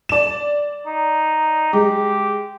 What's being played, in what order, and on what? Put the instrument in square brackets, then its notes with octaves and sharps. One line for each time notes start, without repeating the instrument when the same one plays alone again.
[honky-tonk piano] D5 E7
[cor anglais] D#4
[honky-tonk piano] G#3 [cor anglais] G4